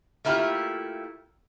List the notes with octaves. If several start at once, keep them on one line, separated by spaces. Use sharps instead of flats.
A3 A#3 E4 F4 G4